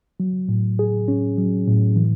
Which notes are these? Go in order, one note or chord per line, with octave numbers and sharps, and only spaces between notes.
F#3
A2
G#4
C#4
F#3
A2
E3